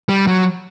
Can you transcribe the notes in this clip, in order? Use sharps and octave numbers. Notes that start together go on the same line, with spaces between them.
G3
F#3